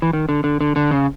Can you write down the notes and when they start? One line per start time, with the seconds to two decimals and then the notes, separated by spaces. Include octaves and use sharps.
0.02 E3
0.13 D#3
0.29 D3
0.44 D3
0.61 D3
0.76 D3
0.91 C#3